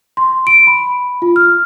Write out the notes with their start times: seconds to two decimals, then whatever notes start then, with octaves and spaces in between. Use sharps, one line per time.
0.17 C6
0.47 D7
0.67 B5
1.22 F4
1.36 F6